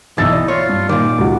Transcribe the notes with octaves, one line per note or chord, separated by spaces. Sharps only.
B1 E3 D#4 E6 A6
D5
F4 C#5
G2
A#2 D#3 D6
C#2 F#4